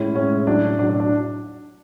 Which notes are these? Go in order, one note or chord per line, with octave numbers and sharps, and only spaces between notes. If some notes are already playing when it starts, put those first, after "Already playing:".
Already playing: A2 G#3 C#4 E4
A2 G#3 C#4
A2 F#3 D4
A2 F#3 D4
D4
D4